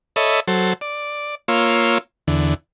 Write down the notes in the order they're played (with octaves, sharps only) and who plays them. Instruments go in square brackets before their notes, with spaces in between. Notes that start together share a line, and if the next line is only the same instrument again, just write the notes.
[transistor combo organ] A4 C#5 D#5 E5 B5
F#3 A4 C5
D5
A#3 F4 C#5 C6 E6
E2 D3